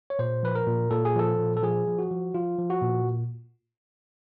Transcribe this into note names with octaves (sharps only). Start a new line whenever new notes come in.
C#5
A#2 C5
F3 B4
A#4
A#2
A#2 A4
G#4
F3 A4
A#2
A4
F3 G#4
F3
F#4
F3
F3 F4
F3
F#4
A#2